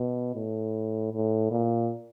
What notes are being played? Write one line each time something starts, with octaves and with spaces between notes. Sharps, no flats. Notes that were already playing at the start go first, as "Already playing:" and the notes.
Already playing: B2
A2
A2
A#2